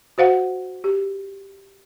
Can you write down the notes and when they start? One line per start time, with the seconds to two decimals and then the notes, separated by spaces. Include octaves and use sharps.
0.18 F#4 C5 F5 F#5
0.84 G4